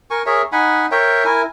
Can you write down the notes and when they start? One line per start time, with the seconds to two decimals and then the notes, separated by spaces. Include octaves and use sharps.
0.10 A#4 G#5 C#6
0.26 G#4 A#4 C#5 E5
0.52 D#4 F#5 G#5 B5
0.91 A#4 C#5 E5 G5
1.25 E4 A#4 G#5